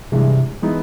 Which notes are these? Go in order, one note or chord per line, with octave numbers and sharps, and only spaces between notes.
G2 C3 E3 G#3
E3 G#3 B3 D#4